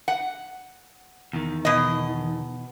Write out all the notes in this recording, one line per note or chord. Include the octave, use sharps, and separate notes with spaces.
F#5
E2 D#3
B2 D#5